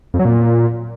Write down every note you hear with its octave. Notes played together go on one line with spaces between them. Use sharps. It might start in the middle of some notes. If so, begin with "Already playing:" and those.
F2
F#3
A#2